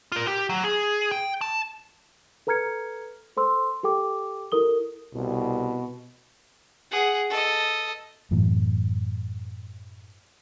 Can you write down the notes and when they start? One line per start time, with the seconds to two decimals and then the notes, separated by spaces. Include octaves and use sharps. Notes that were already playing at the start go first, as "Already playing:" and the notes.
0.12 F4 A#4
0.27 G4
0.49 F#3
0.64 G#4
1.11 G5
1.41 A5
2.47 A4 B4 A#5 F6 G#6 C#7
3.37 A4 C5 C6 E6
3.83 G4 A4 G5 D6
4.52 E4 G4 A4 A#4 D#6 G7
5.15 C2 B2
6.91 G#4 F#5
7.30 A4 D#5
8.31 F#2 A2 E3